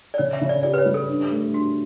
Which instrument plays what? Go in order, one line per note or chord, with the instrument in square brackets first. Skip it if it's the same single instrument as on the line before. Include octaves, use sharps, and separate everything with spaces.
[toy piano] D5
[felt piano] C#3 [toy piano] C#5
[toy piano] E5
[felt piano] C#3
[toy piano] D5
[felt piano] G4 [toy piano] D5
[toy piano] B4
C#5
[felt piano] G3
[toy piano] A4
[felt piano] D4
A3
[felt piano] D4 [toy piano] F#4